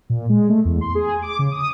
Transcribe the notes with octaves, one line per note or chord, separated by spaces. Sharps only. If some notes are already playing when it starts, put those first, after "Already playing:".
A#2
G#3
A3
E2
C6
G#4
D6
C#3
D#6